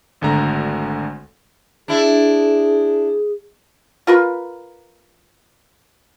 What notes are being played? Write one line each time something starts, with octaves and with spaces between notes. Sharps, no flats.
G#1 D2 D3 A#5
D4 E4 G#4
F4 A#4 B4